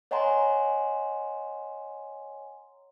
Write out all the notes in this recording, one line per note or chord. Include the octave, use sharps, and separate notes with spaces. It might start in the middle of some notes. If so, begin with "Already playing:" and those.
C#5 D#5 F#5 G#5 A#5 C6